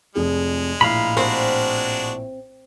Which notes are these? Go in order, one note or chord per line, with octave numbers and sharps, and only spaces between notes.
F1 F2 G#3 G#4
A#1 A2 F5 A#5 B5
G#3 C4 D4 F#4